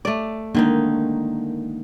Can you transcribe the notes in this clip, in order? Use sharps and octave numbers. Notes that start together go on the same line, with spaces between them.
A3 D5
D3 D#3 G#3 A#3 D#4